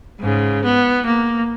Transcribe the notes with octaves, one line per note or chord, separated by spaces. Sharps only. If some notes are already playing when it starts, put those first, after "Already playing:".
G#2 C#3
B3
A#3